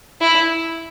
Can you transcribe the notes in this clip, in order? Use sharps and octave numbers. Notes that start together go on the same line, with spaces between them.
E4